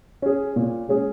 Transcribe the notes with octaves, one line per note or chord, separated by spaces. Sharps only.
C#4 G#4
A#2
G#3 C#4 G#4